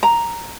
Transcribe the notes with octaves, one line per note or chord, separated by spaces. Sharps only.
A#5